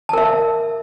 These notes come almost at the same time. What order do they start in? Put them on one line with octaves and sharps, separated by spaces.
A5 A#4 E5